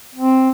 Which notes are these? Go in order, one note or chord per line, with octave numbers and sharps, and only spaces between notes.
C4